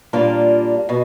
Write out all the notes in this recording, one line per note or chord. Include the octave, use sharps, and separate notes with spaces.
A#2 G3 A#3 D4 F4
B2